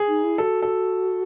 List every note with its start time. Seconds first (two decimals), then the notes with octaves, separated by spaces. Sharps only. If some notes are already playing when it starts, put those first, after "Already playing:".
Already playing: G#4
0.08 D#4
0.24 E4
0.38 F#4 A4
0.62 A4